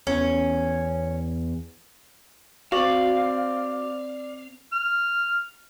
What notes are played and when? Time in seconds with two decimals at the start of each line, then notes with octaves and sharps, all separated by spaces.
0.07 E2 C#4
2.72 C4 F#4 D5 F5
4.72 F6